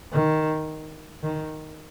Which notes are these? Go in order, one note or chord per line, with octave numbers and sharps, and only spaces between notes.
D#3
D#3